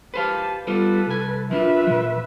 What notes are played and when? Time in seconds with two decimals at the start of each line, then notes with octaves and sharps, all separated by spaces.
0.14 G4 B4 C5 F5 A5
0.67 G3 B3 F4 A4 B4
1.07 C2 G#5
1.51 F3 D4 F4 B4 E5
1.87 A#2 F3